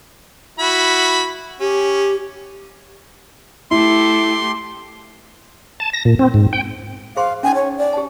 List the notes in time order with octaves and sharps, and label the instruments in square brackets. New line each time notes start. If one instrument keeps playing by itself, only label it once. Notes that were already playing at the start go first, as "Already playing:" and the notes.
[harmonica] E4 F#4 B5
[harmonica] C#4 [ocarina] G4
[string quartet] A3 G4 A4 [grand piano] E4 [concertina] C6
[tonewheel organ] A5
A#6
A#2
C4
G#2
G5
[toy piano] G#4 C5 C6 [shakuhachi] F5
[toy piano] C#4 D#4 [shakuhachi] G#5
[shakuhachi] C#5
D5
[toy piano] G4 A5